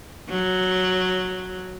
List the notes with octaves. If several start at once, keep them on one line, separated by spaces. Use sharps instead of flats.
F#3